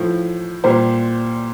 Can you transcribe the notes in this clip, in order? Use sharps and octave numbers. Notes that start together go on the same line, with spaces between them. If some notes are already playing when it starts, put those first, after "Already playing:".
Already playing: A2 F3
A#2 G3 C5